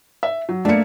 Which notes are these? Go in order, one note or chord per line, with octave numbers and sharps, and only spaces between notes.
E5
F#3
A3 A#3 D4 C#7